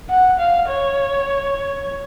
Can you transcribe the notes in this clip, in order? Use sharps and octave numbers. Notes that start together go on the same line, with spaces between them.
F#5
F5
C#5